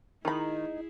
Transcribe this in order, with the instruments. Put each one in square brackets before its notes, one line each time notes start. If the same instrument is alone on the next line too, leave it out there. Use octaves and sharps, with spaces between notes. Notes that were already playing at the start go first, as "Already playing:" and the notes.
[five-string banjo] D#3 B5 [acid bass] D#4 [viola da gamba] E4 G#4